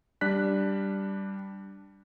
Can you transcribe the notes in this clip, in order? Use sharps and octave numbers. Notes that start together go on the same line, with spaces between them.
G3 D4 F#6 B6